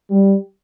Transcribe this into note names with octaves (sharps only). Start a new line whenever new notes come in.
G3